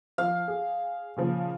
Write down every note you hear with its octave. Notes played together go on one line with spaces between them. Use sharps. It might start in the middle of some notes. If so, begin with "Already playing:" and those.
F3 F5
G#4
A#2 C#3 F3